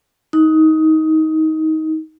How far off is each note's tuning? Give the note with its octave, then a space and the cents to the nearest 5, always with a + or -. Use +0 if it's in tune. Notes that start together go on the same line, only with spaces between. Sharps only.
D#4 +20